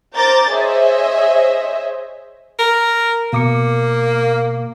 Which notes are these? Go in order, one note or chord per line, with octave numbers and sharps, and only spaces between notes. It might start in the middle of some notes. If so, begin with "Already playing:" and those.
A#4 C5 A#5 D6 G6 A6
G#4 C5 C#5 D#5 E5
A#4
B2 A#3 D6 C#7